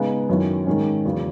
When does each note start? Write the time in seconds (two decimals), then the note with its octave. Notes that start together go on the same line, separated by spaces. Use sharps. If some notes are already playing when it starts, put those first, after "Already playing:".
Already playing: C#3 G#3 B3 D#4 G#4
0.29 F#2 D#3 F#3 C#4 E4
0.67 G#2 D#3 G#3 C#4
1.05 E2 C#3 F#3